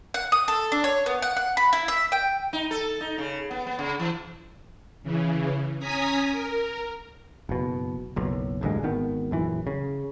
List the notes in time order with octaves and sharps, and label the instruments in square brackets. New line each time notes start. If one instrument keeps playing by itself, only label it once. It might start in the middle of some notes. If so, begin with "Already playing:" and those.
[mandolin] F#5
D#6
A4
D4
C#5
B3
F#5
F#5
B5
E4
E5
G5
[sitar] D#4
A4
D#4
C#3
B3
B3
C#3
E3
[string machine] C#3 E3
C#4 G#5 A#5 D#6 B6
A#4
[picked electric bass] F#1 B2
F#1 B1
A1 D2 G2 G#3
G#1 D#3 B3
A#1 F#2 E3
C#3